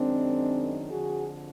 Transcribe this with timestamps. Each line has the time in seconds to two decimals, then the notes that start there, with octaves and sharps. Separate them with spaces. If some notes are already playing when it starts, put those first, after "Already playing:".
Already playing: F#2 D#3 G#3 C4 D4
0.89 F2 D3 F3 F#4 G#4